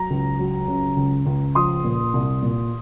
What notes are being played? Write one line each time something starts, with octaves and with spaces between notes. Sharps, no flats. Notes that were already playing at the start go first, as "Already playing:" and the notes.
Already playing: F#3 A#5
C#2
F#3
C#3
C#2
C#2
F3 C6 D#6
A#2
C2
A#2